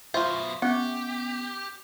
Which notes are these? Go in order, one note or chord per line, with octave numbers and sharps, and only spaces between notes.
F#2 B2 F4 C5 E5
B3 C#4 G4 F#5